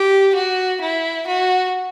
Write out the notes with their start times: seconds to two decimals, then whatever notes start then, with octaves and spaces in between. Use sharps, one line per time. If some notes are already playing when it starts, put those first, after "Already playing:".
Already playing: G4
0.35 F#4
0.82 E4
1.27 F#4